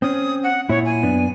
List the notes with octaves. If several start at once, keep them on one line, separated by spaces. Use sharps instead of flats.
C4 C#4 D#6
F#5
A#2 E4 C#5
G#5
F#2 B3 D4